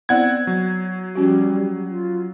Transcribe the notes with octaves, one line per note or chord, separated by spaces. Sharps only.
B3 C4 E4 D5 F#5 G#6
F#3
F3 G3 C#4 F#4
F4